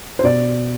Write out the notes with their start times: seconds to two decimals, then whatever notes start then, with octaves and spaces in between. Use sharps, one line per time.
0.19 C5
0.24 B2 D5